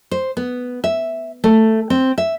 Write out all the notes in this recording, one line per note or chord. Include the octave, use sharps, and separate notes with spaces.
C5
B3
E5
A3
C4
E5